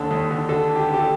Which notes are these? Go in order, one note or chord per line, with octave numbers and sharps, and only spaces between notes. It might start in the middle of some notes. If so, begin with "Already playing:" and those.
Already playing: D#2 D3 A4
D#2
D3
D3 A4
D3
G4
D3
G4
A4